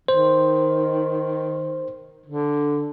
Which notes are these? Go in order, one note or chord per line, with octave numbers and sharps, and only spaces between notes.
D#3 C5
D3